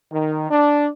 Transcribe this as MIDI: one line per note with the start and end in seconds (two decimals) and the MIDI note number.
0.11 0.46 51
0.49 0.87 62